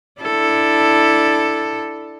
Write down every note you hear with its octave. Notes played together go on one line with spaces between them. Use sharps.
D4 E4 A4